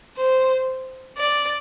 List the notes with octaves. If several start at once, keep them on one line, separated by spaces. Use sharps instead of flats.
C5
D5